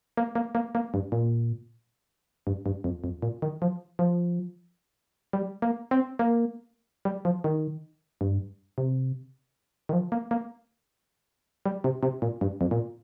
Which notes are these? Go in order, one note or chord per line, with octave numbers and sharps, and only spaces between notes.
A#3
A#3
A#3
A#3
G2
A#2
G2
G2
F2
F2
A#2
D#3
F3
F3
G3
A#3
C4
A#3
G3
F3
D#3
G2
C3
D#3
F3
A#3
A#3
G3
C3
C3
A#2
G2
F2
A#2